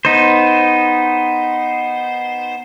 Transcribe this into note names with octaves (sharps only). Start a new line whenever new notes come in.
B3 D#4 C5